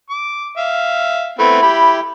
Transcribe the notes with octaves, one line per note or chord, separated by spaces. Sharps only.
D6
E5 F5
A3 B3 C4 E4
G4 B5